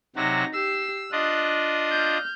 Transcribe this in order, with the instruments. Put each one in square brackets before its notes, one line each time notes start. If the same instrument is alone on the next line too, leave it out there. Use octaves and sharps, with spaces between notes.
[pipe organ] C3 F#3 F#4 [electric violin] D#4 A#6
[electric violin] G4 C7 [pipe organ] E6
[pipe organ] D4 F4 D#5 [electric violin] F#6
[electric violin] F6 G6